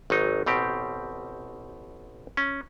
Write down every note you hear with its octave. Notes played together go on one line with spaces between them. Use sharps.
G#1 F#3 D#4
A1 B2 C4 G4
C#4